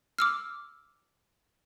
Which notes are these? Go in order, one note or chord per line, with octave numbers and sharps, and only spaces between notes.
D6 E6 F6